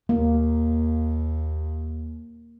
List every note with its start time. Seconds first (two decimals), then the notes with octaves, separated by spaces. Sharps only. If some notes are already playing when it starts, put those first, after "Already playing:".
0.09 D#2 A#3